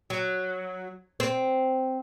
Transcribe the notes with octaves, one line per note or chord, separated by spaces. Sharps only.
F#3
C4